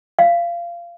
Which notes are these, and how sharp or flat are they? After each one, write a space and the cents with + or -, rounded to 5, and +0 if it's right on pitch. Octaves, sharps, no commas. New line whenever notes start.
F5 -20